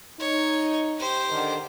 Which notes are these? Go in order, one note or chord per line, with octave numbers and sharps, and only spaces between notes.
D#4 C#5
G4 C5
D3 D#3